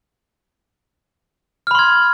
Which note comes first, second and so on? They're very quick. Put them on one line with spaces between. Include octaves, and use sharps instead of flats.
F6 B5 C6 G#6